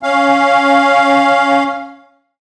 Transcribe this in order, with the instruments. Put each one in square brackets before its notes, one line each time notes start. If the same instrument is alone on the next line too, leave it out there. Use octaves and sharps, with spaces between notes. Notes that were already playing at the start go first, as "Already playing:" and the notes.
[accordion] C#4 F5